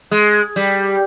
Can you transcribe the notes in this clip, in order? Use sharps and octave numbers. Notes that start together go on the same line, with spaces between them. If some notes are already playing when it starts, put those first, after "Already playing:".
G#3
G3